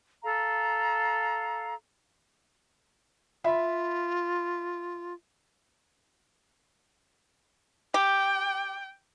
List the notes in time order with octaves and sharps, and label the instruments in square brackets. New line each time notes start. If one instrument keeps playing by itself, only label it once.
[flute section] A4 F5 A#5
[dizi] F4 [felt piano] E5 B5
[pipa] G4 [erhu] G5